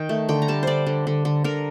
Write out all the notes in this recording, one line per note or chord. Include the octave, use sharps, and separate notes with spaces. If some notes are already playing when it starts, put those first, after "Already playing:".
Already playing: D#3 G5
A3
D3 G5
A#5
G3 A5
D3 C5 D5
D3
D3
D3
D3 A#4